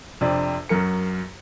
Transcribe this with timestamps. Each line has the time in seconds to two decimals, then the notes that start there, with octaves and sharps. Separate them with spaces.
0.21 F2 C3 D4
0.69 F#2 F#3 A#4 C#7